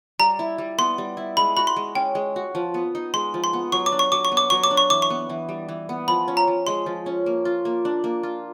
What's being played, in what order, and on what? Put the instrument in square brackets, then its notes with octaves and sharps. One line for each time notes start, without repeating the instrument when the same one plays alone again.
[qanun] G3 [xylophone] A#5
[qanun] E4
G3
[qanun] B3 [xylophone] C6
[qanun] G3
E4
[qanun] G#3 [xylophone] B5
[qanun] F#4 [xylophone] B5
[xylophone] C6
[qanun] G#3
[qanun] C#4 [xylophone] G5
[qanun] G#3
F#4
F3
B3
D#4
[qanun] G#3 [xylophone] C6
[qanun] F3
[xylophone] C6
[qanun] B3
[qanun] F#3 [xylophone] C#6
[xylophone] D6
[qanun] D4
[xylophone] C#6
[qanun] F#3 [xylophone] D6
[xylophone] C#6
[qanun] B3
[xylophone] D6
[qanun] F#3 [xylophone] C#6
[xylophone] D6
[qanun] D4
[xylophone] C#6
[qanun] E3 [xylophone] D6
[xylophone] C#6
[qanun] B3
E3
G3
E3
B3
[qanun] F3 [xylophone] B5
[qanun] C#4
[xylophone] A#5
[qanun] F3
[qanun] G#3 [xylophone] C6
[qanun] F3
C#4
A#3
F4
A#3
D4
A#3
F4